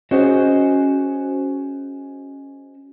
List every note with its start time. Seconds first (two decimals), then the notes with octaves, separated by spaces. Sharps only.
0.11 C#4 F#4 G#4 C5 C#5 D#5